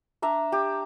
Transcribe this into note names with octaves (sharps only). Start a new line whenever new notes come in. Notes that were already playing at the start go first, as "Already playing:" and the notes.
D4 E5 A#5
G4